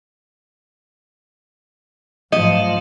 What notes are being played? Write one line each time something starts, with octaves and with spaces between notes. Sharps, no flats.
G#2 F3 F#3 A3 F4 D#5